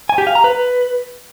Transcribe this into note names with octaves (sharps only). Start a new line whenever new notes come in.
G#5
G4
F5
A#5
B4